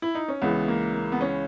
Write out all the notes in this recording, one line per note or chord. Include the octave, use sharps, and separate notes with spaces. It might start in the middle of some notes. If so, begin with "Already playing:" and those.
E4
D#4
C#4
C#2 C#3 E3 B3
A#3
A#3
B3
C#4